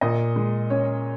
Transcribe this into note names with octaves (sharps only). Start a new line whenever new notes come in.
A#2 D#5
G#3
C#4 C#5